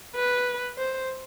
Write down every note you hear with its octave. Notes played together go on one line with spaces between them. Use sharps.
B4
C5